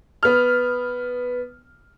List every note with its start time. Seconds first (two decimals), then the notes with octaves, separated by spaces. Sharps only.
0.23 B3 F6